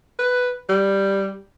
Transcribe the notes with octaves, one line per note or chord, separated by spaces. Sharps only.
B4
G3